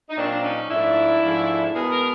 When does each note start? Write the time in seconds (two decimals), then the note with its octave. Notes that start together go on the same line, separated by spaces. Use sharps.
0.10 D#4
0.18 A#2 F#3 A#3 C4 D4
0.44 C#4 D#4
0.70 G#2 F3 A3 D4 E4
1.21 G#2 F3 A3
1.73 B2 G#3 B3 G#4 A#4
1.90 G#4 A#4